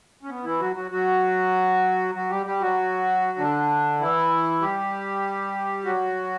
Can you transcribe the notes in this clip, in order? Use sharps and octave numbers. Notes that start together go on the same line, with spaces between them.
C#4
B3
E3 E4
F#3 F#4
F#3 F#4
F#3 F#4
F#3 F#4
G3 G4
G3 G4
F#3 F#4
D3 D4
E3 E4
G3 G4
F#3 F#4